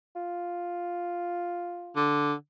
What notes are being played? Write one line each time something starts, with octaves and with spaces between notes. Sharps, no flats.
F4
D3